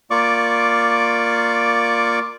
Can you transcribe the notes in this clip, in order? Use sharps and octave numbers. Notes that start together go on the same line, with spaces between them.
A#3 F4 D5 C#6 D6